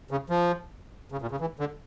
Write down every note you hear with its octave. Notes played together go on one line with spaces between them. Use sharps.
C#3
F3
C#3
A#2
C#3
E3
D3